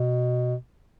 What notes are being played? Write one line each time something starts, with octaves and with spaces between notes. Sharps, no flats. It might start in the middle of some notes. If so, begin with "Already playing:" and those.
Already playing: B2